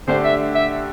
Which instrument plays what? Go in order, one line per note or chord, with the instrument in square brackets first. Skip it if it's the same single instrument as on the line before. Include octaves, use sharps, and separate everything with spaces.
[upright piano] D3 A3 D4 G4 [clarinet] C5
[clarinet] E5
E5